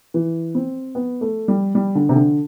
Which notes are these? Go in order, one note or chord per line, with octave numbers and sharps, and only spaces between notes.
E3
C4
B3
A3
G3
G3
D3
C3
D3